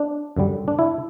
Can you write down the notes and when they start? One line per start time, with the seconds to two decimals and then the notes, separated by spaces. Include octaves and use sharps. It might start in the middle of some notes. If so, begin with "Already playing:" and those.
Already playing: D4
0.36 F#2 D3 G3
0.68 D4
0.79 E4